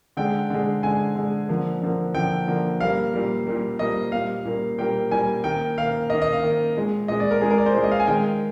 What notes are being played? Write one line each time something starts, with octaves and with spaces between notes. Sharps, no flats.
D3 G#3 G5
D3 G#3
D3 G#3 G#5
D3 G#3
D3 F3 A#3
D3 F3 A#3
D3 F3 A#3 G5
D3 F3 A#3
A#2 G3 A#3 F5
A#2 G3 A#3
A#2 G3 A#3
A#2 G3 A#3 D#5
A#2 G3 A#3 F5
A#2 G3 A#3
A#2 G3 A#3 G5
A#2 G3 A#3 G#5
D#3 A#3 G5
D#3 A#3 F5
D#3 A#3 D#5
D#5
F5
D#3 A#3
A#2 G#3
A#2 G#3 D#5
D5
A#4
A#2 G#3 G#4
A#4
D5
C5
A#2 G#3 D5
D#5
F5
G#5
D#3 G#3 G5